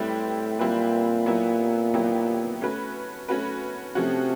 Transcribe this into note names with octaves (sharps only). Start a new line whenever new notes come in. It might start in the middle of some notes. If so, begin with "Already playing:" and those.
Already playing: A2 G3 C4 E4 G4 B4
A#2 G3 C4 E4 G4 B4
F#3 B3 E4 G4
F#3 B3 E4 G4
A3 C#4 F#4 B4
A3 C#4 F#4 B4
C3 F3 A3 C#4 F#4